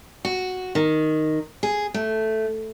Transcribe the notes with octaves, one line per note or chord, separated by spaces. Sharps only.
F#4
D#3
G#4
A3